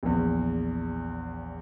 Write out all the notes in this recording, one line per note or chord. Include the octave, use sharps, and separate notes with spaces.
A#1 E2